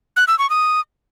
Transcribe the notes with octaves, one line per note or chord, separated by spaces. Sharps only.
F#6
E6
C#6
D#6